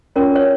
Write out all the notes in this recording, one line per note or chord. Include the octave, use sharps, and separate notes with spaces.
C#4 F4 A#4 C#5
C#5